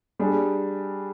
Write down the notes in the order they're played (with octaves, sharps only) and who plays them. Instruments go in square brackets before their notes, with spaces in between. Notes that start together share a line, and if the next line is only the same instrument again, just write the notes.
[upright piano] G3 D4 G#4